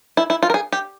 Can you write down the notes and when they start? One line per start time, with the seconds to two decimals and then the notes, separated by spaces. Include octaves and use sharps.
0.17 E4
0.30 E4
0.43 F4
0.50 A#4
0.54 G#4
0.73 G4